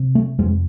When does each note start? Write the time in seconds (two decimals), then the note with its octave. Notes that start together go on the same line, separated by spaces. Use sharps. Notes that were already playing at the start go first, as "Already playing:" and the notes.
Already playing: C3
0.15 A3
0.39 F2 G#3